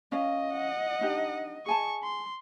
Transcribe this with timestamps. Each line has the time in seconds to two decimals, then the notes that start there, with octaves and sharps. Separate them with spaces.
0.12 C#4 D#5 F5
0.53 F#5
1.01 D4 D#4 G4
1.66 G#4 G#5 A5 C#6
2.03 C6